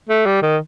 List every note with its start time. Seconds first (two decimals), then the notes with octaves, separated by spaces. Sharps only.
0.09 A3
0.26 G3
0.42 D#3